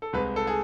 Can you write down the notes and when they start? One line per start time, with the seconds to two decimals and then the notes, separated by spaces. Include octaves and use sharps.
0.02 A4
0.13 C2 C3 G#3 B4
0.36 A4
0.47 G#4